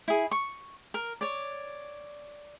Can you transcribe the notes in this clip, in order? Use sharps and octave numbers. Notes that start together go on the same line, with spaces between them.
E4 G#4
C#6
A#4
C#5 D5